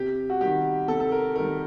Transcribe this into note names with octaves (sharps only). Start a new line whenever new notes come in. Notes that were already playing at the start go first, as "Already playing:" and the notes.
Already playing: C3 G4
F#4
D#3 G3 G4
C3 A4
A4
A#4
D#3 G3 A#4